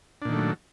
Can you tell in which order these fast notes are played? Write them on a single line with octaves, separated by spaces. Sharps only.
D4 A#2 D#3 A3 F#3